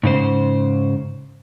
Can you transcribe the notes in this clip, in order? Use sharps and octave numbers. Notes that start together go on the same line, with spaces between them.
G#2 C#3 C5